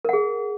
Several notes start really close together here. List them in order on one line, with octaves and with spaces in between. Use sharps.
A#4 F#5 G#4